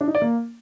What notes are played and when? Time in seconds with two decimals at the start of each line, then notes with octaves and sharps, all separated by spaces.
0.01 D4
0.08 D#4
0.15 D5
0.22 A#3